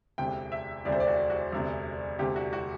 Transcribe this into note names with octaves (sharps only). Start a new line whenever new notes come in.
E1 D2 C3 G5
E5
E1 D2 C3 D5
C5
D5
F#4
F#4
E1 D2 C3
E1 D2 C3 G4
F#4
F#4